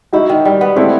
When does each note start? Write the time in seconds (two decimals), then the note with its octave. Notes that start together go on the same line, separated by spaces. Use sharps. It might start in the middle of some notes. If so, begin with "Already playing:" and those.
0.13 D#4 E4 F#4
0.29 D#3
0.45 G3
0.61 B3
0.76 A3 C4 E4